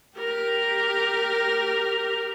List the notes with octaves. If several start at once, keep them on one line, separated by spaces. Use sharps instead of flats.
G4 A#4